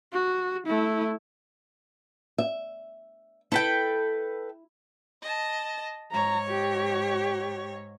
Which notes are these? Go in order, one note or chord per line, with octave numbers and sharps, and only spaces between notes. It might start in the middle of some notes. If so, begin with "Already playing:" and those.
F#4
A3 E4
E5
E4 A4 B4 G5
D#5 A5
G#2 C#5 A#5
G4